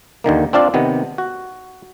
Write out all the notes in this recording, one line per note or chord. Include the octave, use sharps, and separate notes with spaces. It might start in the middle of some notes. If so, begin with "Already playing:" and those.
D#2 D3 D#3 A#3
C4 D4 F4 D5 F5
C3 D#3 B3
F#4